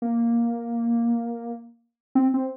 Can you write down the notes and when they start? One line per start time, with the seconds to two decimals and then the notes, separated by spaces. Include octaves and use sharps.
0.02 A#3
2.15 C4
2.34 C4